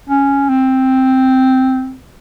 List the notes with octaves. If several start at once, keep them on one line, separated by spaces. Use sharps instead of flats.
C#4
C4